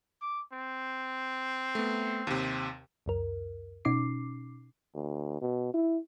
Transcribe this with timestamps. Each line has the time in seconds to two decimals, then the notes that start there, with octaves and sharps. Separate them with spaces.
0.21 D6
0.52 C4
1.75 A3 B3
2.27 D#2 C3
3.06 C#2 F#2 A#4
3.85 B2 C#4 D#4 D6 C7
4.94 D2
5.42 B2
5.74 E4